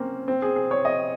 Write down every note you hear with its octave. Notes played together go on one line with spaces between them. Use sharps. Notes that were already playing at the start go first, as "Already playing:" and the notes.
Already playing: A#3 C4 C#4
C4
G#4
G#4
C#5
D#5